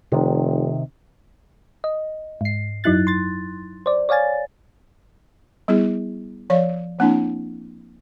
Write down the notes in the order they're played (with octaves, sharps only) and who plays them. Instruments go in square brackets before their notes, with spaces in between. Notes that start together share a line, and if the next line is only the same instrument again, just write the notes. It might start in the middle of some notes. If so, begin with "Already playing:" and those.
[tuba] F1 [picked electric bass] C3 D#3
[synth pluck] D#5
G#2 C7
F#2 F#3 D#4 E4 F#6 A6
C6 A6
C5 D5
C#5 D5 F5 G#5 A6
[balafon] G3 B3 E4 G#4
F3 C#5 D5 F5
F3 A#3 C4 D4 E4